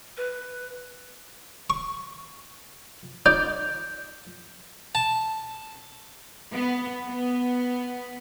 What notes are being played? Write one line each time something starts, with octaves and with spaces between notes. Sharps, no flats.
B4
C#6
D#4 D5 G6
A5
B3
B3